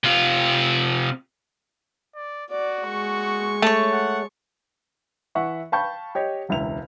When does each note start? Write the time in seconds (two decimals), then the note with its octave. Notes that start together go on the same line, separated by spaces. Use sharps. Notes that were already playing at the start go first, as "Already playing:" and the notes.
0.04 C3 F4
2.15 D5
2.50 F#4 D5
2.86 G#3 C#6
3.62 A3 C#5 A5
3.92 F#5
5.35 E3 E5 F#5 C#6
5.72 F5 G5 A5 B5 C#6 G6
6.15 G4 C#5 D#5
6.49 E1 C#2 E4 F7